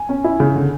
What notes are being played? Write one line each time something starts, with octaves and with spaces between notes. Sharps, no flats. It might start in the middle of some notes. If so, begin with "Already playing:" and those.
Already playing: G#5
C#4
E4
C#3
D3